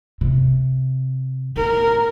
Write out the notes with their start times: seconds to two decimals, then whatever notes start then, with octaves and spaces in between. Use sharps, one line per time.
0.21 C3
1.56 A2 A#4